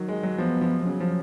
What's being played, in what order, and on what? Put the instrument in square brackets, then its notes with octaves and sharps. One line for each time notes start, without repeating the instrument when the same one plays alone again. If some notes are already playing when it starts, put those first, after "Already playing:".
Already playing: [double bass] D#3 [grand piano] F#3
[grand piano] G#3
F#3
[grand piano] F3 [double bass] B3
[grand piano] F3
[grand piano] C#3 [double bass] F#3
[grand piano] F3